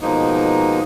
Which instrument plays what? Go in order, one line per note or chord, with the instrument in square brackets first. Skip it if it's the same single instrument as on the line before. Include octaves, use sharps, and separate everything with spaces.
[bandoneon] B2 F3 G#3 A#3 D#4